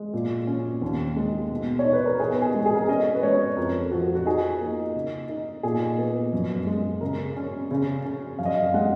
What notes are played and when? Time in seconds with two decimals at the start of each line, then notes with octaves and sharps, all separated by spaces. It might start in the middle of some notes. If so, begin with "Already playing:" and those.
Already playing: G#3
0.14 A#2
0.47 C#4
0.82 D#2
1.16 G#3
1.51 B2
1.79 C#5
1.85 D#4
1.93 B4
2.06 A#4
2.20 B3 G#4
2.42 G#4
2.55 G#3
2.66 G#4
2.74 A#4
2.80 G#4
2.89 C#4 D#5
3.15 B4
3.23 G#3 C#5
3.57 F2 A#4
3.91 F3 F#4
4.15 F#4
4.26 D#4 G#4
4.61 A#3
4.96 C#3
5.29 D#4
5.63 A#2 G#4
5.98 B3
6.33 F#2
6.66 G#3
7.01 C#3 A#4
7.36 C#4
7.71 C#3
8.05 C#4
8.39 F#2 F5
8.46 D#5
8.53 F5
8.64 F5
8.74 G#3 F#5